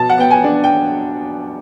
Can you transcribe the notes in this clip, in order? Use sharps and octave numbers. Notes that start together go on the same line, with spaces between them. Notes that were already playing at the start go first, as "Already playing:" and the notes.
Already playing: B2 A5
F#5
B3 G5
G#5
D4
G5